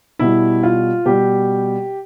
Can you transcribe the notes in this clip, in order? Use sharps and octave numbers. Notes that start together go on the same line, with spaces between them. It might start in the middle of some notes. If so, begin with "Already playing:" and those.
B2 G3 E4
F4
B2 G3 G4